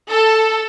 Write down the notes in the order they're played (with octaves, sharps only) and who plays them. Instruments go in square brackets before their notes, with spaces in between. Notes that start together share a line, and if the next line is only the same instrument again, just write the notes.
[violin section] A4